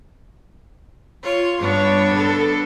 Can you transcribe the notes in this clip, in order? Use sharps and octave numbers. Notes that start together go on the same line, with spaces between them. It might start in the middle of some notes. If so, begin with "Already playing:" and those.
F4 C#5
G2 B3 D4 C#5
D3 A4